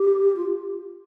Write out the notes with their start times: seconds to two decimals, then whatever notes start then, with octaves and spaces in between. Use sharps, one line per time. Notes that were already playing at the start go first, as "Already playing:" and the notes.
Already playing: G4
0.36 F4